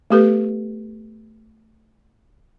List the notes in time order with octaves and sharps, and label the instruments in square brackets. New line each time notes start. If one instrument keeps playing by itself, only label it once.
[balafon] A3 B3 G4 A4 B4